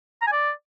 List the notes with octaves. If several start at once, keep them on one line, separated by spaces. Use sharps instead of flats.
A#5
G#5
D5